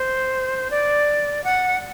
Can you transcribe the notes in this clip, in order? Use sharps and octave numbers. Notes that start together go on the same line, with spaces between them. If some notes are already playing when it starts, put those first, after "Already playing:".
Already playing: C5
D5
F#5